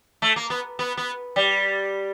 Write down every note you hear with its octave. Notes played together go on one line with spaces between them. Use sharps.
A3
A#3
B3
B3
B3
G3